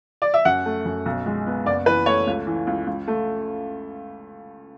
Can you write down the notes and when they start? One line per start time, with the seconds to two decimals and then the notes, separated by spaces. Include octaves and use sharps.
0.22 D5
0.34 E5
0.45 F#2 F#5
0.65 A3
0.85 F#2
1.06 B1
1.26 G#3
1.47 B3
1.66 F#1 D5
1.86 E3 B4
2.06 A3 C#5
2.27 C#2
2.47 E3
2.67 C#2
2.87 C#2
3.08 A3